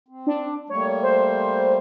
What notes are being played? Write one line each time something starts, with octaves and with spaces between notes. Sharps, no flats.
C4
D4
G3 A3 A#3 C#5
C5